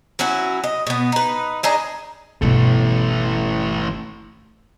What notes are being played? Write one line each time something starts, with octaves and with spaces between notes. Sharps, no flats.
F#3 C#4 E4 F#4
D#5
B2 B3
D#4 B4
D4 D#4 G#4 D#5
G1 B2 E3 A3